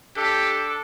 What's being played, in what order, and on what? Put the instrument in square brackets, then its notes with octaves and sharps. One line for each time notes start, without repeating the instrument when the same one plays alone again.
[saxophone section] D4 A4 [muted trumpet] G4